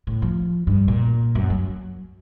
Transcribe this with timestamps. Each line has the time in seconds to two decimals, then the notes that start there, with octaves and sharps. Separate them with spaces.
0.07 A2
0.22 F3
0.67 G2
0.88 A#2
1.35 F#2
1.50 F#3